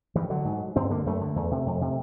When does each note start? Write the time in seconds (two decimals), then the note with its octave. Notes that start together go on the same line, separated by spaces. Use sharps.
0.15 G2 E3
0.30 D3 F#3
0.45 G#2
0.76 G2 C4
0.90 D3 A#3
1.06 F#2 A3
1.21 D3
1.36 E2
1.51 C3
1.67 F2
1.81 C3